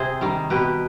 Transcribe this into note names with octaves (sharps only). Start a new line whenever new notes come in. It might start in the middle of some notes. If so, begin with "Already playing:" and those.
Already playing: C3 G#4 C5
D#3 G3
B2 G4 B4